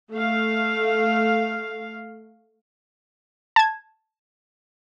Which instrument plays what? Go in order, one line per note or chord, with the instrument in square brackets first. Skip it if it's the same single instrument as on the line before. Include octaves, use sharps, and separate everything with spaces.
[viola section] A3 F5
[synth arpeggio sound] A5 G#6